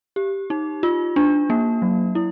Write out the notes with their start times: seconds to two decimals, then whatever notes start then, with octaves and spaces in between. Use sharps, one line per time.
0.16 G4
0.50 D#4
0.83 F4
1.16 D4
1.50 A#3
1.82 F#3
2.15 E4